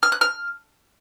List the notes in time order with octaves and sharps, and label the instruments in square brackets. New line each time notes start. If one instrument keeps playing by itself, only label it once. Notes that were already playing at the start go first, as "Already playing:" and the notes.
[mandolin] F6
F#6
F6